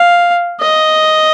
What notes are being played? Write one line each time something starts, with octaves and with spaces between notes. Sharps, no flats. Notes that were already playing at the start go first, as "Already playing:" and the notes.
Already playing: F5
D#5